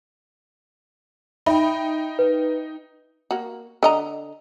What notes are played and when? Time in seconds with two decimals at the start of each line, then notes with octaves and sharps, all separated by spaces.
1.46 D#4 E5 G5 B5
2.19 B4
3.31 A#3 F#4
3.83 D3 D#5 A#5